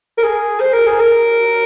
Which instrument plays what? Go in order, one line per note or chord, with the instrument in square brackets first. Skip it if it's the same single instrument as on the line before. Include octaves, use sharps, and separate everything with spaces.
[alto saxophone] A#4
G#4
C5
A#4
G#4
A#4